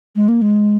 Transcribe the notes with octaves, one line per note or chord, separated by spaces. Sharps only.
G#3
A#3
G#3